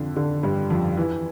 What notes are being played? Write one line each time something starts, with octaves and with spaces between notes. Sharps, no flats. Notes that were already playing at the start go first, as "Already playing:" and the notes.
Already playing: F2 D3
D3
G2 G3
F2 F3
E3